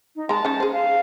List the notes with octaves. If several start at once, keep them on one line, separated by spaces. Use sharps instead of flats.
D#4
G#3 A5 A#5
C#4 D#4
G#4 C5
F5